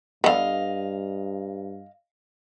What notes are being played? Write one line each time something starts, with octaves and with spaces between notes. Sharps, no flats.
G2 D3 B3 D#5 F5